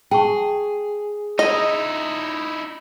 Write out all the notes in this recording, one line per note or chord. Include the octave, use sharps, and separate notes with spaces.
G#4 G5 A5 C#6
D#4 E4 D#5